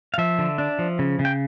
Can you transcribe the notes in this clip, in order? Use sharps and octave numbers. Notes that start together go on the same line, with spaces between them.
F5
F3 E5
D3
D4
F3
C#3
C#3
G5